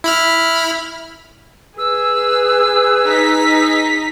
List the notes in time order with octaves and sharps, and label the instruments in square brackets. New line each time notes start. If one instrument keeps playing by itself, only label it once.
[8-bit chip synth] E4 B5 F6
[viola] G#4 [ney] B4 [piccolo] E6
[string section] D#4 B6